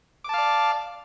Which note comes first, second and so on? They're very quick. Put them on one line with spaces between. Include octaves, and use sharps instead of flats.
D6 A5 F5 D5